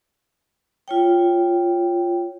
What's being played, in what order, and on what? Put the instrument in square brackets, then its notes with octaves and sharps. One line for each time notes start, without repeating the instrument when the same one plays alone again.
[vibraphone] F4 C#5 G5